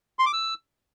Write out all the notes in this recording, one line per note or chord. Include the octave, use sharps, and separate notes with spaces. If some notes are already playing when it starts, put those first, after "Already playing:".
C6
D6
E6